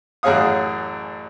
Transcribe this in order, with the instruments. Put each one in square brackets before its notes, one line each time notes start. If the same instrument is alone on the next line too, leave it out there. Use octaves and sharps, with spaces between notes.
[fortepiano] A1 F#2 G#4 C#5 F5 D#6